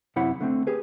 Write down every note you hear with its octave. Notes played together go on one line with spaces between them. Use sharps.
F#2 C3 E4 C#5 F#5 B5
D3 A3 C4
G4 G#4 B4